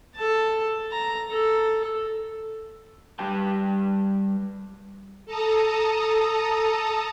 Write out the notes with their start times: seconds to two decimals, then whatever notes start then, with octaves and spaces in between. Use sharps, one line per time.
0.16 A4 A5
0.92 A#5
1.31 A4
3.19 G3 G4 B4 G5 A5
5.26 A4 A5 A#5 D#6